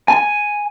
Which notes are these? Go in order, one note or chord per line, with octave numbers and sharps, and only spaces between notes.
G#5